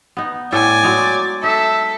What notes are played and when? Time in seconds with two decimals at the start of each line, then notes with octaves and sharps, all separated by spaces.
0.17 B3 D#4
0.52 A2 A4 D5 G#5
0.83 F#3 G#3 D#4
1.44 D#4 A4 E5